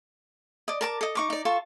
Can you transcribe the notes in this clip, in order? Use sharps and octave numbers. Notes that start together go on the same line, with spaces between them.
D5 D#5
A#4 A5 D6
A4 D#5
D#4 C#6 D6
D#4 D5
F4 A4 A5 C#6